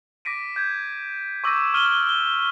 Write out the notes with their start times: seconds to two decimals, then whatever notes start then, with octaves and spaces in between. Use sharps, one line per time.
0.25 D6 A#6 B6 D7 D#7
0.56 G6 G#6
1.44 C#6 D6 E6 G6 A#6 D#7
1.74 C#6 F6 D#7 F#7 G7
2.09 G7